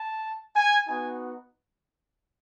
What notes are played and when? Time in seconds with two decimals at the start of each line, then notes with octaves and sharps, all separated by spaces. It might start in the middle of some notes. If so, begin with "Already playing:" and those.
Already playing: A5
0.55 G#5
0.88 B3 D#4 F#4 G#5